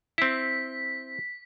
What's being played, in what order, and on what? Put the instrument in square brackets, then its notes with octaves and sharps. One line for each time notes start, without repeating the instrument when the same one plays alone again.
[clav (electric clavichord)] C4 E4 [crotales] B6